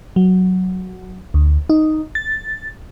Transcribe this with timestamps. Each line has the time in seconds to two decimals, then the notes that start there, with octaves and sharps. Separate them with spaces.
0.16 F#3
1.34 D2
1.70 D#4
2.15 A6